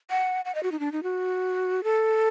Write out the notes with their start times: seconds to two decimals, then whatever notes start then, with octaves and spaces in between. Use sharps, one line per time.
0.10 F#5
0.45 F#5
0.55 D#5
0.63 F#4
0.72 D#4
0.80 D4
0.92 D#4
1.03 F#4
1.84 A4